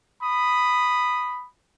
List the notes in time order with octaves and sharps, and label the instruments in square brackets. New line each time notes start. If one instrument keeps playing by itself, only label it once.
[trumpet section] B5 D#6